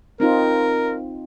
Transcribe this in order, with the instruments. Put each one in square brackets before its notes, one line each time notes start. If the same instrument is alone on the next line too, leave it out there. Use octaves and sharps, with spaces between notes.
[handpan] C4 D#4 F4 [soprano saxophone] A#4